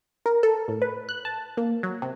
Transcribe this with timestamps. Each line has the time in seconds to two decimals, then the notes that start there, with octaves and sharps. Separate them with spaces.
0.26 A#4
0.43 A4
0.68 A2
0.82 B4
1.09 F#6
1.25 A5
1.57 A#3
1.83 F#3
2.02 C3